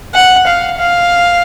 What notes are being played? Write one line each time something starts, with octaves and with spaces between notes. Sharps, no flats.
F#5
F5
F5